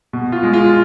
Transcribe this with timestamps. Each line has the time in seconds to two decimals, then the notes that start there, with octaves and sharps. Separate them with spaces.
0.13 B2
0.32 F4
0.43 G#3
0.53 F4